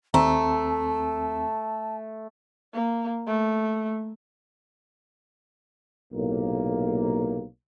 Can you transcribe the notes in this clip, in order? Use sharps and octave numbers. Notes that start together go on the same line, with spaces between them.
D#2 A3 C4 A5 A#5
A#3
A3
B1 A2 C3 A#3